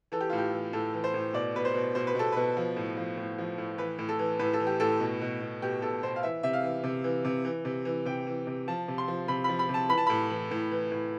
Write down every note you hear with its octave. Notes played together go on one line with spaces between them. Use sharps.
E3 A4
G4
A2 F4
G4
E3
A2 A4
E3
C5
A2
B2 D5
B2 B4
C5
B2
B2 C5
B4
B2 A4
B2 B4
F3
A2
F3
A2
F3
A2
E3 B4
A2
A4
E3
A2 B4
A4
E3
G4
A2 A4
B2
B2
B2
B2 G4
B2 A4
B2 C5
F5
E3 E5
C3 E5
F5
E3
C3
E3
C3
E3
C3
E3
C3 G5
E3
C3
F3 A5
C3
C6
F3
C3 B5
B5
F3
B5
C3
A5
E3 B5
A5
A2 B5
E3
A2
E3
A2